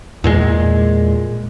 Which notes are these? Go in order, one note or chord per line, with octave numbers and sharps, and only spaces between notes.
E2 A#2 G#3